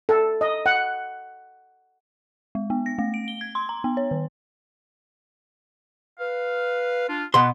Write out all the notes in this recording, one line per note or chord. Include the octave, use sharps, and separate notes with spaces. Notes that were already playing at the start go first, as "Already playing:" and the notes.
A4
D#5
F#5
G#3
B3
A#6
A3
D7
G7
G#6
C6
A#5
B3
C#5
D#3
B4 F5
D4 F4
B2 B3 C6